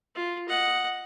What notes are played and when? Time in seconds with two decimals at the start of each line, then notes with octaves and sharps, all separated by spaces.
0.15 F4
0.48 D#5 F#5